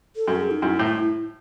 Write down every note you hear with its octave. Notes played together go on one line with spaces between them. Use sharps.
A4
F#2
G#4
D#4
F#2 E4
A2
E4